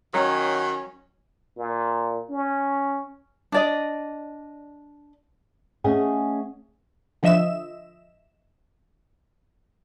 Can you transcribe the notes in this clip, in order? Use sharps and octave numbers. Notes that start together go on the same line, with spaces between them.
D#3 F#3 C#4 F#4
A#2
C#4
D4 D5 D#5
A3 C#4 G#4 D#5 F#5 G#5
D3 F3 D#5 E5 E7